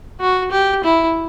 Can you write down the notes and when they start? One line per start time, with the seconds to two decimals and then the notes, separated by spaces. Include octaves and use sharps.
0.20 F#4
0.51 G4
0.84 E4